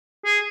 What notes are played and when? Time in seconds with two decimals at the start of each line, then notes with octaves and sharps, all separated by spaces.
0.25 G#4